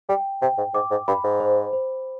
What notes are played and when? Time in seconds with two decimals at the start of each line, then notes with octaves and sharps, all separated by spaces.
0.09 G3 G5
0.42 C3 G5
0.58 G#2
0.74 G#2 D6
0.91 G#2
1.08 G2 B5
1.24 G#2
1.40 C5
1.73 C5